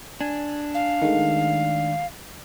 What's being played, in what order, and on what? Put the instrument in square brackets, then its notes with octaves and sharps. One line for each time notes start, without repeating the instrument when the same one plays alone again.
[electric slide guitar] D4 [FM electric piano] G#5
[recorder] F5
[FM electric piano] D#3 G#3 A3